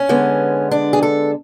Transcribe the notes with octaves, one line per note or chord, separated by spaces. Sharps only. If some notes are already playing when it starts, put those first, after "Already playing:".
Already playing: C#4
D3 G#3 B3
D4
G#4
A4